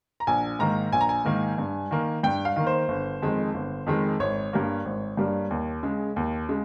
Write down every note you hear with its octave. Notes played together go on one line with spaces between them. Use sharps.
A#5
A#1 G#5
G#2 D#3 A#3 A#5
A#1 G#5
A#5
G#5
G#2 D#3 A#3
G2
D#3 A#3
G2 G5
F5
D#3 A#3
C5
G1
F2 D#3 G#3
G1
F2 D#3 G#3
G#1 C#5
G2 G3 A#3
G#1
G2 G3 A#3
D#2
C#3 G#3
D#2
C#3 G#3